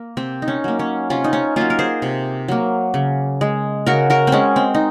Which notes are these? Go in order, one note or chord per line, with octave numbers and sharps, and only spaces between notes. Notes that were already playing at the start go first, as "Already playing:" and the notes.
Already playing: A#3
C3 C4
D#4
C#4
F#3 A#3
C#4
C3 C#4 F4
D#4
C#4
F#3 A#3 C#4 F4
A#4
G#4 C5
C3
F#3 A#3
C#3
G#3
C#3 F#4 A#4
F#4 A#4
C4
G#3 C#4
C4
D#4